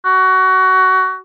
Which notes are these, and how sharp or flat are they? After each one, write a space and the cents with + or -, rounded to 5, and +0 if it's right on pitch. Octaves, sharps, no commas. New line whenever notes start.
F#4 +20